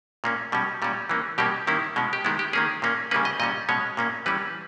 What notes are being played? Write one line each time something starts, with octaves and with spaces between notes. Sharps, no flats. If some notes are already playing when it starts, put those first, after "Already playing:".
A#2 A#3 C#4
B2 G3 C#4
A#2 G3 C#4
E3 A#3 C#4
B2 G3 A#3 C#4 G4
D#3 A#3 C#4 E4
B2 G#3 C#4
G4
D#3 G#3 B3 E4
G4
D#3 A#3 C#4 G#4
A#2 A#3 C#4
C#3 G3 A#3 C#4 B4
D#5
A#2 G3 C#4 D#5
B2 G#3 C#4 C#5
A#2 A#3 C#4
E3 G3 C#4 B4